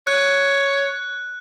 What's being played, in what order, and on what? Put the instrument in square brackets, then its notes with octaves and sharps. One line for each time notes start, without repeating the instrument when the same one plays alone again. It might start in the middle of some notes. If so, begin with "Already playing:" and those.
[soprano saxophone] C#5 [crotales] F#6